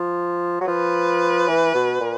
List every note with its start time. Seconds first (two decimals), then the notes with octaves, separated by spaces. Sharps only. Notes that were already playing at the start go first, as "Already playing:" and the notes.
Already playing: F3
0.61 F#3
0.68 F3 B4
1.48 E3
1.74 B2
2.00 A#2